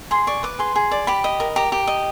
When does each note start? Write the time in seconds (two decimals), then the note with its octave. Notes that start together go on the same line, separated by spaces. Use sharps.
0.11 G#4 C6
0.27 D5 C#6
0.43 B4 D6
0.59 G#4 C6
0.76 G#4
0.91 D5
1.07 G4 B5
1.24 D#5
1.40 A#4
1.56 G4 A#5
1.72 G4
1.87 D#5